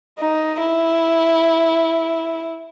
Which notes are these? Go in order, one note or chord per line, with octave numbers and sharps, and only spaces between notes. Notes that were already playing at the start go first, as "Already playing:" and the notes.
D#4
E4